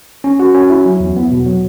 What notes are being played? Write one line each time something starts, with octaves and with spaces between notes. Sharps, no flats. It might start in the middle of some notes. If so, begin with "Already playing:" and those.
C#4
F#4
C#4
E4
F#3
E2
B3
B2
F#3